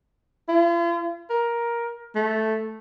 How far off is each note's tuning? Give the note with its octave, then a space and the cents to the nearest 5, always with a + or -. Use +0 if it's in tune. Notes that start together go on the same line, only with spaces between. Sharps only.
F4 -45
A#4 +10
A3 -5